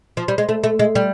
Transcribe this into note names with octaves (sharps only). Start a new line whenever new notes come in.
F3
G3
G#3
A3
A3
G#3
G3